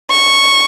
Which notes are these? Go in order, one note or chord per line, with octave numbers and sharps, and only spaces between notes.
C#6